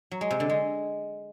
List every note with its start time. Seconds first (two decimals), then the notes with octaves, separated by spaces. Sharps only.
0.11 F#3
0.21 G#3
0.31 C3
0.40 D3
0.50 G#3